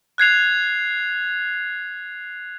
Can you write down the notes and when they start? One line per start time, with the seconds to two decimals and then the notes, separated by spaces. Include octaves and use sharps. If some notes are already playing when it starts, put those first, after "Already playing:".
0.18 F#6 G#6 C7 F7